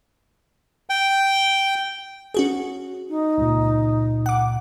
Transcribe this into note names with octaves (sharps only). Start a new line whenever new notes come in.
G5
C#4 F#4 G#4
D#4
C#2 A#2
F#5 D6